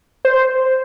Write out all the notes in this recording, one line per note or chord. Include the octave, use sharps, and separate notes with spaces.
C5